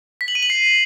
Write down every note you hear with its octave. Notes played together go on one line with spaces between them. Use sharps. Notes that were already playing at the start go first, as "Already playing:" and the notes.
B6
F#7
D#7
F#7
C7